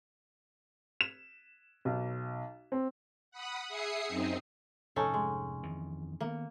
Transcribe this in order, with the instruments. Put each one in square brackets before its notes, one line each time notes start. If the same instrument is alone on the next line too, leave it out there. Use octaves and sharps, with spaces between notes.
[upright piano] E7
B1
C4
[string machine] F#5 B5 D#6
G#4 E5 D#6 C7 C#7
F#2 C4 D#4
[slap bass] F1 G#2 [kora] C#4 D#4 A4
[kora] G#3
[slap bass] F2 D#3 E3
[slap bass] D#3 B3 [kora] A#3